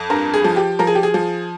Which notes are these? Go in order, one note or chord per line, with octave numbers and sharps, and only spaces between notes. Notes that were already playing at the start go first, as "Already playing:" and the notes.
Already playing: F2
G2 A#4
G#4
F3
G4
F3 A#4
G#4
G4
G#4
F3